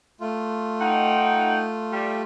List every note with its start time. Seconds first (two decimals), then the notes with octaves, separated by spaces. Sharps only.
0.21 A3 F4
0.81 D#4 F#5 G5
1.91 G3